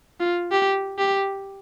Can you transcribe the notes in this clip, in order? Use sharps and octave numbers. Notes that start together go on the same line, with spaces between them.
F4
G4
G4